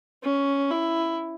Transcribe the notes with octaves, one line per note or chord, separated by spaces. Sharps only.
C#4
E4